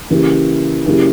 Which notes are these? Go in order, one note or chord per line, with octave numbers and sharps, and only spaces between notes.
C#3 E3 A#3 E4 G4
C#3 F#3 A#3 E4 G4